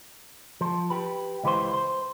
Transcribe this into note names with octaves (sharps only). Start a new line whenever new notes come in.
F3
G4 B4
C#2 E3 G4 B4 C5
C5